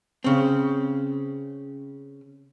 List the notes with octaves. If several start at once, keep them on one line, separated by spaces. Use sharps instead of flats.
C#3 C4